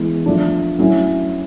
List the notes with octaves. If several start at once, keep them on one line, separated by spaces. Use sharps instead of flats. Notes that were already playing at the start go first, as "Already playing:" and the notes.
Already playing: E3 G#3 B3
F3 A3 D4
F#3 A3 C#4 E4